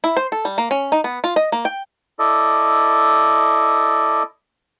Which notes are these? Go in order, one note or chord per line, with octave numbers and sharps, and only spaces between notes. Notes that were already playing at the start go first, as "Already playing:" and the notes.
E4
C5
A4
G3
A#3
C#4
D#4
B3
F4
D#5
A#3
G5
E4 A4 D5 D#5